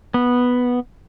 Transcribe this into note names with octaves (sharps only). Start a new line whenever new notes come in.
B3